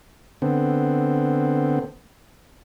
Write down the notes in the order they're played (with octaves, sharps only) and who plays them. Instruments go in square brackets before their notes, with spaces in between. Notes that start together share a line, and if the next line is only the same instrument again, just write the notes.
[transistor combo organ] D3 B3 C4